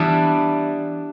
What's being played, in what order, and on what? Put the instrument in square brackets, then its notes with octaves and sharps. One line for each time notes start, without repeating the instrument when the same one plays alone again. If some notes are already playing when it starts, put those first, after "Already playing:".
Already playing: [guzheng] E3 G3 B3 D4